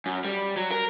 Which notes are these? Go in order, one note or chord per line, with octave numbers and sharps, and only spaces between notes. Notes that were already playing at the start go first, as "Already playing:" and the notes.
F#2
G3
F#3
A#4